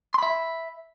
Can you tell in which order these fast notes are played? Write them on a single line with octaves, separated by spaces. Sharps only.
C6 B5 E5